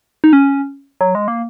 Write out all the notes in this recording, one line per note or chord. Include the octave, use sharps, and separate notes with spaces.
D#4
C#4
F#3
G#3
A#3